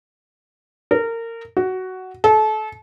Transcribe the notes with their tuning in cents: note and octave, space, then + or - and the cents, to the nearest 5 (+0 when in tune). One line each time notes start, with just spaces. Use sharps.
A#4 -25
F#4 +10
A4 -30